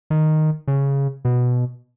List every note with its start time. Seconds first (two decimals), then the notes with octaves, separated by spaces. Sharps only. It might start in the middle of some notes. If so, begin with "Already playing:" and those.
0.10 D#3
0.68 C#3
1.25 B2